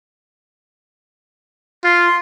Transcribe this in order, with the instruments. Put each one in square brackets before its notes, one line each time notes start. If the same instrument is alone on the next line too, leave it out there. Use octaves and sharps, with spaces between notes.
[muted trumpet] F4 [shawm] C6